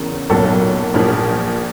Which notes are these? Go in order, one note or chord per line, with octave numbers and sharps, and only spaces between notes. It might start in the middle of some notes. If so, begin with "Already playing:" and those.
Already playing: E2 C#3 A#4
B1 A#2 F#3 A4
A#1 A#2 F3